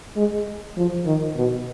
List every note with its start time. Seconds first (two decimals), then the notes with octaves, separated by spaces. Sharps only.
0.16 G#3
0.76 F3
1.05 D#3
1.36 B2